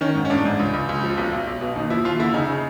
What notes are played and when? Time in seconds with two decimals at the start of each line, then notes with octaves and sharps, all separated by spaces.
0.01 D#3 C#4
0.15 G#2
0.25 C#4
0.30 A1 D4
0.45 G#2
0.59 C#2
0.73 C#2
0.89 C#2
1.03 F3
1.17 B1
1.32 B1
1.47 B1
1.61 B2
1.76 D#2 D#4
1.90 F3 E4
2.04 D#2 F4
2.19 D3 E4
2.33 C#3 D#4
2.48 C#3